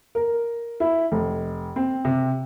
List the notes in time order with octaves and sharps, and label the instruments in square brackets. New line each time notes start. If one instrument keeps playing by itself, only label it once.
[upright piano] A#4
E4
F1
C4
C3